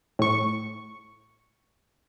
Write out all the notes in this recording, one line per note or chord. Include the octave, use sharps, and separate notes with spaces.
A2 C#6